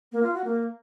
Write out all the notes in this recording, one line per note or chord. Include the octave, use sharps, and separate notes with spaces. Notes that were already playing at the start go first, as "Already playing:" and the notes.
A#3
F4
F#4
A#3